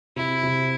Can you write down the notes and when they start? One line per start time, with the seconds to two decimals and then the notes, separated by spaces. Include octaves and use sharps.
0.16 C3 E4
0.43 C3